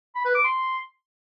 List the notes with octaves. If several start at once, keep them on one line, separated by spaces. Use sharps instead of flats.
B5
B4
D6
C6